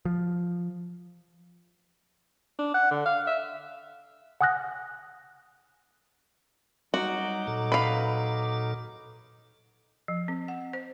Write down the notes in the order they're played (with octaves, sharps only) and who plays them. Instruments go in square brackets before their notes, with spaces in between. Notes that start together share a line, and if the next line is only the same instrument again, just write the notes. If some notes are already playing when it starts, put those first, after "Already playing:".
[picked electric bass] F3
[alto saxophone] D4
F#5
D3
F5
E5
[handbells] F#5 G#5 D#6 F6 F#6 A#6
[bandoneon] F#3 D#4 D6 [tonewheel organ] G3 [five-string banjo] F#4
[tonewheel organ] A#2 A4
[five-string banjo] B4 F5 [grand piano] B5
[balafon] F3
C4
F#5
C5